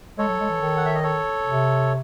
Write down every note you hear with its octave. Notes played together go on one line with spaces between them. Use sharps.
G#3 A4 C#5
F#3
G#3
E3
D#3
F#5
E5
D#5
A4 C#5
C3